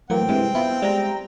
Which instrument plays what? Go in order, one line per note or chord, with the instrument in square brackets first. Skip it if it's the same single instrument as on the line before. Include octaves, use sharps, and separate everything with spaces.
[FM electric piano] A2 E3 A#3 [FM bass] F#3 [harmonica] C4 G5
[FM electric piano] G2 C3 E3 [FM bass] G#3
[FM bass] B3 [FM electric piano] E4 F4
[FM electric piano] G3 A#5 [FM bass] G#3